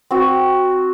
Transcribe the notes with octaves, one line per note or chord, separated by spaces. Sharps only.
C4 F#4